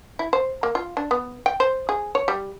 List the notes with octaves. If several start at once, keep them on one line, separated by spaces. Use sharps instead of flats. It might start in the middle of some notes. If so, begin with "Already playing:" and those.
E4
C5
A#3
F4
D4
B3
G5
C5
G#4
C#5
G3